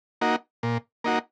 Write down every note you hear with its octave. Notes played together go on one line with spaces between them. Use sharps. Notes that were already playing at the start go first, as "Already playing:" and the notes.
A#3 D#4 F#4
A#2
A#3 D#4 F#4